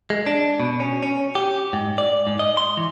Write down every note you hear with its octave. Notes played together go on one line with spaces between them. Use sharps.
G#3
D4
B2
C#4
C#4
G4
G#2
D5
G#2
D#5
C6
E3